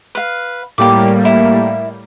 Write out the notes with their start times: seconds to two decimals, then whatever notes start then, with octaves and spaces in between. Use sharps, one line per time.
0.15 B4 F5
0.78 A2 G3 A#3 G4 D6
1.25 E4